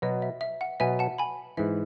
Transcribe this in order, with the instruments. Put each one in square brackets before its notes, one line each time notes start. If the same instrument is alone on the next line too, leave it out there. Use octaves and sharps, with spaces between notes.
[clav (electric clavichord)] B2 F#3 B3 [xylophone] D#5
[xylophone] E5
E5
F#5
[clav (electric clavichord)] B2 F#3 B3 [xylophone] E5 G#5
[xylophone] F#5 A5
G#5 B5
[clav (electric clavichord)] G#2 E3 [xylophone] E5